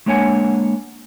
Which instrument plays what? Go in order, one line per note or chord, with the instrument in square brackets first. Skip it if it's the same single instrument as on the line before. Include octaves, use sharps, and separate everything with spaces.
[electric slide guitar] G#3 A#3 D4 C#5 F#5 G#5